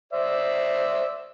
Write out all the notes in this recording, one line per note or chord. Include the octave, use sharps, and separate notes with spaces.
C5 D5 E5